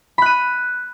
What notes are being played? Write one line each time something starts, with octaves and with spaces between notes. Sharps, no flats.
B5 F#6 D#7